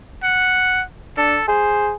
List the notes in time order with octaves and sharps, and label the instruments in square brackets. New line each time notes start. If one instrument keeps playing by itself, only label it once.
[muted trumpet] F#5
[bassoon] D4 [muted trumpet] A4
[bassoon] G#4 [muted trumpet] C5